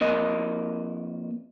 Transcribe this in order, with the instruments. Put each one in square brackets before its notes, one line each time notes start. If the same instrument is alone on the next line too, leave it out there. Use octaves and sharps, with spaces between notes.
[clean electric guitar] F2 A#3 D#5